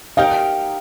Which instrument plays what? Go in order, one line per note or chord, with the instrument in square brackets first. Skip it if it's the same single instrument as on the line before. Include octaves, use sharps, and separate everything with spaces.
[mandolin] D#4 G4 A#4 G5 [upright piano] F5